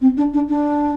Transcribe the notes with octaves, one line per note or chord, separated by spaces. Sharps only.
C4
D4
D4
D4